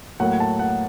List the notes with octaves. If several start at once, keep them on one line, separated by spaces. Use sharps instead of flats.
A2 F#3 A#3 F#5
A5
F#5